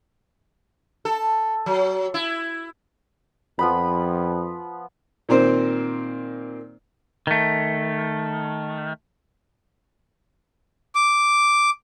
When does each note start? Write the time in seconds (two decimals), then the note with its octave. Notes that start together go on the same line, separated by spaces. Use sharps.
1.05 A4
1.66 F#3
2.14 E4
3.59 F2 F3 B3 B5
5.29 A#2 D#3 A#3 C4 C5
7.27 D#3 A3
10.95 D6